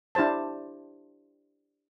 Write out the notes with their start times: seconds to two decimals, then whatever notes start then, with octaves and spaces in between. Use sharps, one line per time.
0.15 D4 E4 G4 C5 A5